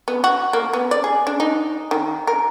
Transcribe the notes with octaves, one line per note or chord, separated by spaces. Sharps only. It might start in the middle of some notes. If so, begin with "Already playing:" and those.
B3
F#4
A#3
B3
D5
G#4
D4
D#4
D#3
A#4